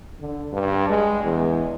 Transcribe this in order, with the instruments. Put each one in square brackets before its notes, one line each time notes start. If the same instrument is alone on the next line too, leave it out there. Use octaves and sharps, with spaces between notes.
[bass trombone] D3
G2
G#3
E2